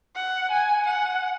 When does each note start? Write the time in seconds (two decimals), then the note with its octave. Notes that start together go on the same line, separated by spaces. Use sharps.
0.16 F#5
0.50 G#5
0.86 F#5